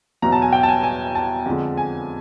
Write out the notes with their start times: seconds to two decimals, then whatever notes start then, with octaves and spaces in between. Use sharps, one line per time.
0.22 E2 B2 F#3 A#5
0.32 A5
0.42 G#5
0.53 G5
0.63 A5
0.69 G#5
0.83 G#5
1.15 A5
1.46 F2 D3 F3 G#3
1.77 G#5